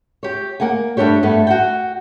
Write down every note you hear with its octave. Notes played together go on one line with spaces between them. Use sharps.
G4 C#5
A#3 A#4 F#5 G#5
G2 A3 D4 G4 C#5
G2 A3 B3
F#4 F#5 G5